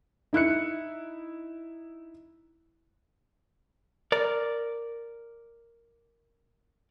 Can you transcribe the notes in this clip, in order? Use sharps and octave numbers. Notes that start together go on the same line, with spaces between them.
D#4 E4 F#6 C#7
A#4 D5